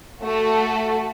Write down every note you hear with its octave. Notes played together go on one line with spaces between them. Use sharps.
A3 F#4 A4